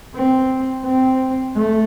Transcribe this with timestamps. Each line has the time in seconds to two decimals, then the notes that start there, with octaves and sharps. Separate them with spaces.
0.14 C4
0.85 C4
1.55 A3